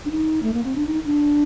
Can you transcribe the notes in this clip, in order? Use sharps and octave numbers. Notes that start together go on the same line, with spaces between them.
D4
D#4
A3
A#3
C4
D4
D#4
D4